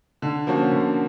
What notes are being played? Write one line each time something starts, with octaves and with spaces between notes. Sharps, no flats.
D3
F3 A#3 C#4 F#4
D3